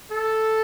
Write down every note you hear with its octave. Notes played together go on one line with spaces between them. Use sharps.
A4